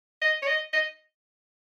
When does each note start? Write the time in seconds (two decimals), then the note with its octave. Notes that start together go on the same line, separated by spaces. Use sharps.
0.22 D#5
0.42 C#5
0.47 D#5
0.73 D#5